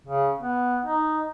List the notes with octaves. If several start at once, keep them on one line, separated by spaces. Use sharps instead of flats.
C#3
B3
D#4